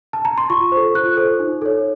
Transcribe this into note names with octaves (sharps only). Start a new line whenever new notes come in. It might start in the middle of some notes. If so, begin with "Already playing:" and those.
A5
A#5
C6
F4 C#6
C5
A4
F4 F#6
A4 C5
D#4
A4 C#5